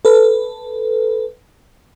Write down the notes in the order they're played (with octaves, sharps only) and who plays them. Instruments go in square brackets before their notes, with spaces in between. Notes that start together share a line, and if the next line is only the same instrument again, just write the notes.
[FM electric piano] A4 B4